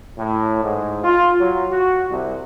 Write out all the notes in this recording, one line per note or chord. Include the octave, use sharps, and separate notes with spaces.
A2
G#2
F4
F#3
F#4
C2